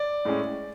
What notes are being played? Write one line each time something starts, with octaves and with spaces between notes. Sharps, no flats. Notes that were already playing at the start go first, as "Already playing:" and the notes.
Already playing: D5
A2 G#3 C#4